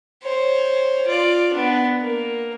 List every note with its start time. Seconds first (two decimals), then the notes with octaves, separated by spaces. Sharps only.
0.23 C5 C#5
1.07 F4 D5
1.54 B3 D4
2.01 A#3